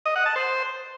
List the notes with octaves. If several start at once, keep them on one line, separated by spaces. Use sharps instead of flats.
D#5
F#5
A5
C5